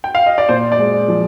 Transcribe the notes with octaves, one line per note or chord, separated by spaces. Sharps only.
G5
F5
D#5
D5
A#2 C5
D5
G#3
F3